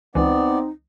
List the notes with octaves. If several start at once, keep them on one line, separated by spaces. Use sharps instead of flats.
C#2 E3 B3 C4 D#4 D5